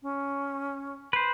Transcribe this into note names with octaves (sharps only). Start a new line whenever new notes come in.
C#4
B4 C5